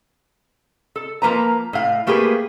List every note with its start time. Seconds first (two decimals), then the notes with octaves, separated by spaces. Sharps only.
0.96 A4
1.22 F3 A#3 B4 A#5
1.73 A2 F5
2.07 A3 A#3 G4 G#4 B4